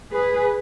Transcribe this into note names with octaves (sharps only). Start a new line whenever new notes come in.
G#4 B4